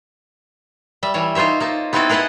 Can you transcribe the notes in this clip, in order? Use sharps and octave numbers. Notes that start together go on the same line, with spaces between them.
G3 E5
E3 G3 C#5
D#4 F4 C5 C#5 E5
A#3 D#4 A5
B3 C4 D#4 E4 F#4 A4
G#4 A#4 B4 D#5 F#5 A5